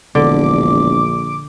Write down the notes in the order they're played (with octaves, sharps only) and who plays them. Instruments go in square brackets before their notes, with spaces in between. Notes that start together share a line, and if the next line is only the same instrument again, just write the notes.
[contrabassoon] E1 [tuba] A#1 [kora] D3 [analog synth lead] D6